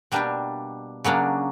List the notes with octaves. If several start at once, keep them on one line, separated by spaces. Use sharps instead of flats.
B2 G3 A#3 D4 G4
C#3 F#3 A#3 D4